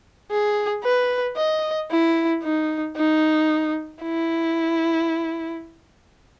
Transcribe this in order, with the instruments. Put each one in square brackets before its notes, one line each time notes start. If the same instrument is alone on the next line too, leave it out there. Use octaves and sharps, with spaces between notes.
[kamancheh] G#4
B4
D#5
E4
D#4
D#4
E4